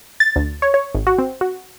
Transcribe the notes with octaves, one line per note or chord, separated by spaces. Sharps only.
A6
D2
C#5
C#5
G#1
F#4
C4
F#4